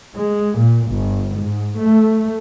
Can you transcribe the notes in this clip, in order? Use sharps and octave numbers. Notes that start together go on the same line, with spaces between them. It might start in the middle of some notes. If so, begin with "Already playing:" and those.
G#3
A#2
G1
G#2
A3